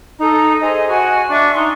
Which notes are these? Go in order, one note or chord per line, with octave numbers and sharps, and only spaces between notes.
D#4 A4 A#5
G#4 C5 D#5
F#4 G#5
D4 E5 C#6 D6
D#4 C6 C#6